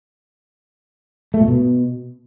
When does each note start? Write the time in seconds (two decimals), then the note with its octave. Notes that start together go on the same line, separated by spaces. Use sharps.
1.34 A3
1.41 A#2
1.48 B2